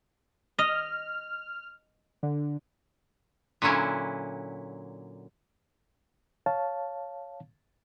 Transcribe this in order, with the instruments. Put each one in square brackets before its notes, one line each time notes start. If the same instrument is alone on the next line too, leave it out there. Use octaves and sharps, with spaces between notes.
[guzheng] D#5 [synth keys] F6
[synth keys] D3
[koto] A#2 D3 F#3 C#4 E4
[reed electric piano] C#5 F5 A5